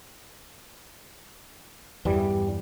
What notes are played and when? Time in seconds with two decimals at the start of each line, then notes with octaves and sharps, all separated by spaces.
2.05 E2 G2 E3 G3